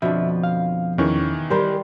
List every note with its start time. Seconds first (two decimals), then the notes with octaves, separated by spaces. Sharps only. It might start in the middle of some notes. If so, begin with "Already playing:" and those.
0.02 F2 B2 D3 F3 E5
0.44 F5
0.98 E2 D#3 E3 C#4 C#6
1.50 G3 G4 A#4 C5